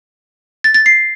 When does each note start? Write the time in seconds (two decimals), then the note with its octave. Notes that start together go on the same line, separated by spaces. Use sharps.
0.64 A6
0.74 A6
0.86 C7